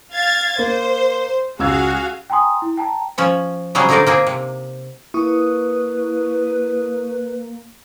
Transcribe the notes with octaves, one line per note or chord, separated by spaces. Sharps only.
F5 G#6 A6
A#3 C5
C#2 F#4 G#4 F5 E6 G#6
G5 G#5 A#5 C6 D#6
E4
G5 A5 A#5
F3 C#4 C#5
C#3 F#3 G3 G#4 C5
D3 C4 D#4 G#4 A#4 D5
A#3 C4 G#4
C3
A#3 E4 B4 C#6 D#6